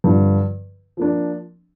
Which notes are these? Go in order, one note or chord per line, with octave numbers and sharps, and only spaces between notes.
G2 D3 F3
F3 A#3 D4